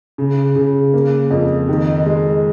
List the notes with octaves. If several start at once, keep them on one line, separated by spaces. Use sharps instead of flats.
C#3
C#3
A#3
F2
D#3
G#3